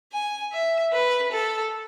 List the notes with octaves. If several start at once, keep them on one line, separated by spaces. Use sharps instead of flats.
G#5
E5
B4
A4